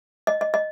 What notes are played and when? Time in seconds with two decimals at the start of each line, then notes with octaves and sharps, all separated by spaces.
0.27 D#5
0.41 D#5
0.54 D#5